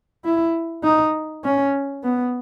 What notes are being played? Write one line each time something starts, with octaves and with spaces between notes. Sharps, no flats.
E4
D#4
C#4
B3